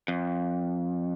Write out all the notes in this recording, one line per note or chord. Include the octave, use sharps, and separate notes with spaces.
F2